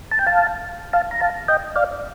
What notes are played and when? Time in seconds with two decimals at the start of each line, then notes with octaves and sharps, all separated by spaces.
0.12 A5
0.19 G5
0.27 F5 A5
0.93 F5 A5
1.11 A#5
1.21 F5 A5
1.48 D#5 G5
1.76 D5 F5